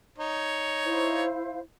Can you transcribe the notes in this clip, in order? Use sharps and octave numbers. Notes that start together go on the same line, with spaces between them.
D#4 C#5
E4 C5 F5